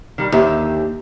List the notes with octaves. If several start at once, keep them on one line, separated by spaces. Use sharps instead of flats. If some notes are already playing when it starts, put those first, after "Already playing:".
D#3 G3
D#2 D3 G4 E5